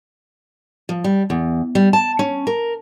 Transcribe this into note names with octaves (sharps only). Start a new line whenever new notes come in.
F3
G3
E2
G3
A5
C#4
A#4